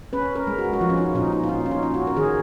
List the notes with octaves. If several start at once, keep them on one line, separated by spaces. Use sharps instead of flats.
C#4 B4
A#4
G#3
F#4
F#4
F3 F4
C#4
D#4
A#2 D#4
D#4
F4
C#4 D#4
C#4
D#4
C#4
F#4
A#4
D#3 G#4